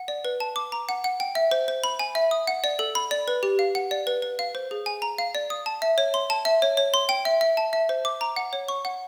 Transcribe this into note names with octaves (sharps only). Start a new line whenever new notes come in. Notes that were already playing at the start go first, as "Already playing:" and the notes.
Already playing: F#5
D5
B4
A5
D6
A#5
F#5
F#5
G5
E5
C5
C5
B5
G#5
E5
D#6
F#5
D5
A4
B5
D5
B4
G4
F5
F#5
D5
B4
B4
F5
C5
G#4
G#5
A#5
F5
D5
D#6
A5
E5
C#5
C6
A5
E5
C#5
C#5
C6
G5
E5
E5
A5
E5
C5
D6
A#5
F#5
C#5
C#6
F#5